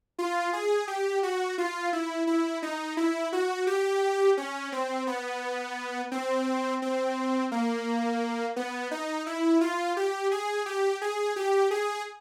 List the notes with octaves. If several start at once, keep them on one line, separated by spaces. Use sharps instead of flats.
F4
G#4
G4
F#4
F4
E4
E4
D#4
E4
F#4
G4
C#4
C4
B3
C4
C4
A#3
B3
D#4
E4
F4
G4
G#4
G4
G#4
G4
G#4